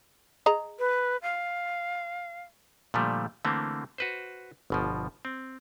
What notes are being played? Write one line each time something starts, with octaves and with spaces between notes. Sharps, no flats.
G#4 D#5 A#5
B4
F5
A#2 D3 F3 G3 A3
D3 E3 A3 A#3 C4
F#4 B4 C5
G1 B2 F3
C4